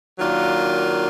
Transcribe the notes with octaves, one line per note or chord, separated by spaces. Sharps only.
D#3 F#3 A#3 D4 F4